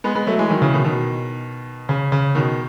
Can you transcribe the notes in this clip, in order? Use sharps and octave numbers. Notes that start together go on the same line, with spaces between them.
G#3 B3
G#3 B3
F#3 A3
E3 G#3
D#3 F#3
C#3 E3
B2 D#3
B2 D#3
C#3
C#3
B2 D#3